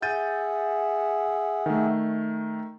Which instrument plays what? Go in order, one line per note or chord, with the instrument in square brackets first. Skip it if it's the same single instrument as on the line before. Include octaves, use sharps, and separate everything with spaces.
[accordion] G#4 E5 F#5 [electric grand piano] G6 A6 D#7
[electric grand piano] D#3 A3